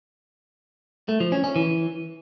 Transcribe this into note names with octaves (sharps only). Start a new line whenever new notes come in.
A3
F3
C#4
C#4
E3